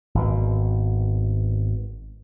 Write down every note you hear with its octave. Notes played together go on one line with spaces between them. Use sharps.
G#1 B2